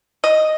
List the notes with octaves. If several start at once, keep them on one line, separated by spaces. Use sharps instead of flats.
D#5